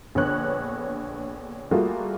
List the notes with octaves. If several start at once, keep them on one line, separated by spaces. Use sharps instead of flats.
A#1 D3 B3 C#5 F#6
G3 A3 A#3 F4 F#4 G#4